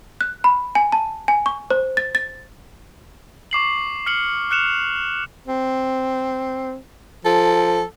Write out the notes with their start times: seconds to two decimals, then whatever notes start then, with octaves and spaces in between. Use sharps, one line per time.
0.21 F#6
0.44 B5
0.75 G#5
0.92 A5
1.28 G#5
1.46 C#6
1.70 C5
1.97 A6
2.15 A6
3.51 C#6 D6 C7 F#7
4.06 F6 C7 C#7 F#7
4.51 F6 F#6 C#7 E7 F7
5.47 C4
7.25 F3 A4